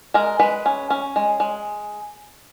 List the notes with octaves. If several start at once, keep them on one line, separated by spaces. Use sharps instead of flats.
G#3 A#4
G#3 B4
C#4
C#4
G#3
G#3